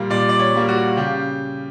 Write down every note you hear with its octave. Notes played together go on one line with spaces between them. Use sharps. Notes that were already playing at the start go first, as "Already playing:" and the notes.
Already playing: A#2 G3 A#3
A#2 D5
D5
C#5
G3 A#3
F#4
C#3 G4